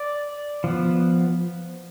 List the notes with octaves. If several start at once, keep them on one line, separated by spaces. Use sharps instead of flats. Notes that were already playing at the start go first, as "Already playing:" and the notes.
Already playing: D5
F3 B3